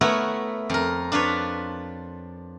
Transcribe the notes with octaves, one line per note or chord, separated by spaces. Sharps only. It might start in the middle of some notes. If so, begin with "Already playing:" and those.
A3 B3 E4 A#4 C#5 F#5
F2 A#4
D4 F4 B4 C#5